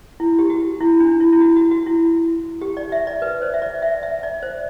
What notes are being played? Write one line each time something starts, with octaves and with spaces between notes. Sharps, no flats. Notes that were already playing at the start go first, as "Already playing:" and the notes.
E4
G4
F#4
E4
D4
E4
E4
F#4
F#4
F#4
E4
G4
D5
E5
D5
B4
C5
E5
D5
E5
E5
D5
C5